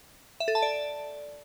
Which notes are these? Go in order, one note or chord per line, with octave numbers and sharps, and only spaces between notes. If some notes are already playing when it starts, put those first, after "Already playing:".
E5
A4
A5
D5